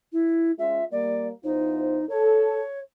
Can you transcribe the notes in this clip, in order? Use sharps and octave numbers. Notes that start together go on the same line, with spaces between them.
E4
G#3 C#4 F4 E5
G3 A#3 D5
E2 D#4 F4 C5
A4 C#5